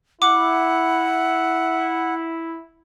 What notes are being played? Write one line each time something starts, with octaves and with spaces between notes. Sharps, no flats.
E4 F#5 D6